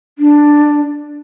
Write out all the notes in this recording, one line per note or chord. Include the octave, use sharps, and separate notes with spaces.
D4